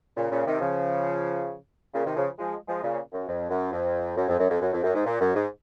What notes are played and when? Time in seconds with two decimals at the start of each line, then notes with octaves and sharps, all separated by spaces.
0.16 A#2 C#3
0.30 A#2 C#3
0.45 C3 D#3
0.61 C#3 F3
1.94 A#2 C#3
2.05 C3 D#3
2.16 C#3 F3
2.39 F3 G#3
2.68 F3 G#3
2.83 A#2 C#3
3.13 F#2
3.28 F2
3.49 F#2
3.72 F2
4.16 F#2
4.28 F2
4.39 F#2
4.49 F2
4.61 F#2
4.72 F2
4.83 F#2
4.94 G#2
5.05 A#2
5.21 F#2
5.35 G#2